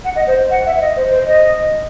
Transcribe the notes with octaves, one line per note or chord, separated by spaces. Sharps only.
F#5
D#5
C5
F#5
E5
D#5
C5
C5
D#5